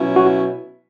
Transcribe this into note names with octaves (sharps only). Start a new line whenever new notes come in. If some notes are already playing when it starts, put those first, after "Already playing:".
Already playing: B2 F#3 C#4 E4
F#4